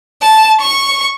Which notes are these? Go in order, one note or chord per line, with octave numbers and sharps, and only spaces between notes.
A5
C#6